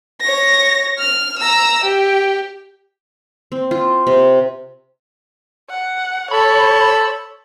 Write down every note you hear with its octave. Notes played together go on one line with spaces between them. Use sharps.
C#5 A#6
F6
A#5 E6
G4
C4
F4
C3
F#5
A4 C#5 B5